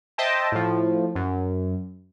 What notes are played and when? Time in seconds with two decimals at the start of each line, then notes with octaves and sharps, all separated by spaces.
0.18 C5 D#5 E5 G5 A5
0.52 A2 F3
1.15 F#2